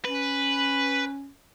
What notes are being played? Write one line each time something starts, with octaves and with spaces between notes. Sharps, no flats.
C#4 B4